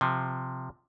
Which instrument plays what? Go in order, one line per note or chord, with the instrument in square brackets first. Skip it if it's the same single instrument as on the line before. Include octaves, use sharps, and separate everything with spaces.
[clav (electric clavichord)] C3 F3